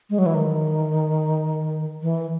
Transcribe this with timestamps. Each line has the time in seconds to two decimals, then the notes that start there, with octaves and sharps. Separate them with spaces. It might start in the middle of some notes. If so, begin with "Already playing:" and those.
0.10 G#3
0.18 F#3
0.26 E3
0.34 D#3
2.02 E3